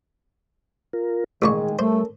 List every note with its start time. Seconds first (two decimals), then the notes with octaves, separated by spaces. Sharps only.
0.93 F4 A#4
1.42 A1 A#2 D#3 G#3 G#4 C#6
1.79 G3 A3 C#4 A4 A#4 C5